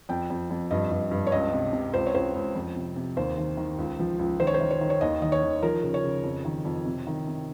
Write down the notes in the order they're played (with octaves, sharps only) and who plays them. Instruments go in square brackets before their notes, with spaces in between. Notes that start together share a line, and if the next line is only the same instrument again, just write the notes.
[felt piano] F2 G5
F2
F2
G2 D#5
G2
G2
C#5
C#2 D#5
C3
C3
C#2 C5
C#5
C#2 C5
C#2
F2
C3
C3
D#2 C5
D#3
D#3
C#2
F3
C#2
D#3 C5
C#5
C5
D#3
C#5
D#3
C#5
D#2 D#5
D#3 D#5
C#5
D#3
F3 A#4
C#3
C#5
C#3
F2
D#3
F2
C3
D#3
C3